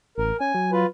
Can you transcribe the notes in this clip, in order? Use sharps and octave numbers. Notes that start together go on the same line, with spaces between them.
A1 A#4
C#4 G#5
F#3
F4 B4